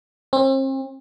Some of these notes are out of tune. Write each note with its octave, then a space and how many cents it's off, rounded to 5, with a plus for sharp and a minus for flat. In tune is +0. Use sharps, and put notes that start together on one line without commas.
C4 +40